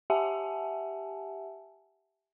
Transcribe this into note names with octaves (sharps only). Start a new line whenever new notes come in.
G4 E5 F#5 G#5 A5